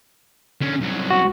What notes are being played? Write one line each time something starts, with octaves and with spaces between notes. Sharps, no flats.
D3 C#4
C2 F#3
F#4